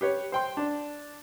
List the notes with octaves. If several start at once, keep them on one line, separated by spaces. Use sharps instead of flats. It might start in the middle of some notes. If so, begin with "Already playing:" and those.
G4 B4 C#5
C5 G5 C6
D4